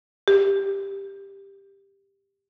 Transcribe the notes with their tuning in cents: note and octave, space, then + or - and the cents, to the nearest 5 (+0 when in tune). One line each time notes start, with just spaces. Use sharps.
G4 +10